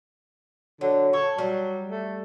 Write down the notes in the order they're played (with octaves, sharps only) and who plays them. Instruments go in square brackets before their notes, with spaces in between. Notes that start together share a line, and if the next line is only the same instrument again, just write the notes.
[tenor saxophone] D3 [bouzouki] F#3
[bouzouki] A4 [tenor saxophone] C#5
[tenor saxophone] F#3 [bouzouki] G3
[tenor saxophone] A3